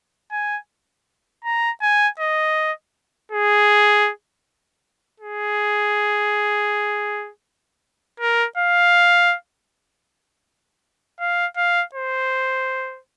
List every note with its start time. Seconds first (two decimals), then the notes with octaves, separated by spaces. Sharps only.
0.32 G#5
1.44 A#5
1.82 G#5
2.19 D#5
3.32 G#4
5.20 G#4
8.20 A#4
8.57 F5
11.20 F5
11.57 F5
11.95 C5